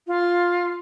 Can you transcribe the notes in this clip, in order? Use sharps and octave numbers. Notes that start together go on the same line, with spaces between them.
F4